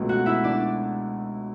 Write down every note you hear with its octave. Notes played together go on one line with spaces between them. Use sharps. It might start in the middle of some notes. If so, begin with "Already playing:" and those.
Already playing: C#2 B2 A3
F#4 F#5
E4 E5
D4 D5